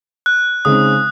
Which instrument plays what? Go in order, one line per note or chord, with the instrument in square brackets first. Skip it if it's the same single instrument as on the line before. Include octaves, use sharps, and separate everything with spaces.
[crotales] F#6
[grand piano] C#3 G#3 C4 D#4 [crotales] D#6